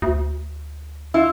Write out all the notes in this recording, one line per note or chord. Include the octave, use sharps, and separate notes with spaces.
D2
E4 F4